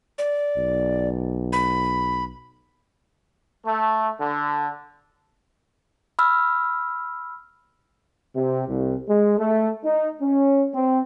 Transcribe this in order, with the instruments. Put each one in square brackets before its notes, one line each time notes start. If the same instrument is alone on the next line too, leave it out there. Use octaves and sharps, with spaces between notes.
[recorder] D5
[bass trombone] B1
[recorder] B5
[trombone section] A3
D3
[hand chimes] B5 E6 F6
[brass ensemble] C3
C2
G#3
A3
D#4
C#4
C4